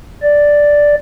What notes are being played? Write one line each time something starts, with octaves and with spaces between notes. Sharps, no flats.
D5